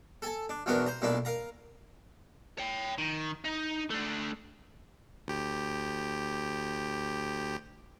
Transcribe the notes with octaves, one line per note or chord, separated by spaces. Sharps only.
A4 G#5 A5
D4
B1 E2 F#3 B3 D4 A#4
C5 A#5
B1 A#2 A#3 D4 E4
A#4 F5 A#5
C#5 G5
D#3
D#4
A3 D4
D2 G4